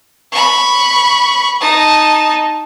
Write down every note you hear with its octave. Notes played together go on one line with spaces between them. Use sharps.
B5 C#6
D#4 A5